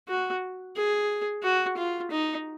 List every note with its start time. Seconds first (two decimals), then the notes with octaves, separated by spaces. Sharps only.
0.08 F#4
0.76 G#4
1.43 F#4
1.77 F4
2.11 D#4